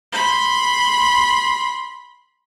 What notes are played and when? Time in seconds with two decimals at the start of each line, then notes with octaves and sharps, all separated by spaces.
0.13 B5 C6